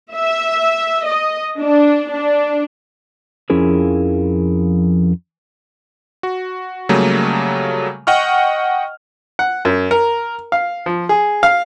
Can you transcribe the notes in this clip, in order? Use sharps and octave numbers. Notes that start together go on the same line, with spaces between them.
E5
D#5
D4
D4
F2 F3 C#4 E4 G#4 A#4
F#4
C#3 F#3 G3 A3 A#3
D#5 F#5 G5 C#6 F6
F#5
F#2
A#4
F5
F3
G#4
F5